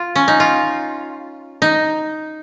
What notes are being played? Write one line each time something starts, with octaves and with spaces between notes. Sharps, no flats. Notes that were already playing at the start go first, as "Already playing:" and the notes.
Already playing: F4
C#4
D#4
F4
D#4